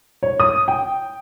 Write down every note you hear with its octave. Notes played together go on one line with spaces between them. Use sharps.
C#5
D#6
G5